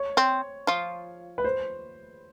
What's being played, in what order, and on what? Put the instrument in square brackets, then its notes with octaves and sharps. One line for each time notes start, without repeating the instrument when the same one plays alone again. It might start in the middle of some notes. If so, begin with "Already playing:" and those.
Already playing: [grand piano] C#5
[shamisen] C4
F3 F4
[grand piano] B4
C5